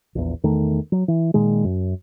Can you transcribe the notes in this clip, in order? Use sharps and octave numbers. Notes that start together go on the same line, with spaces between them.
A#1 E2
E2 D#3 A3
F#3
E3
A#2 D#3 G#3
F#2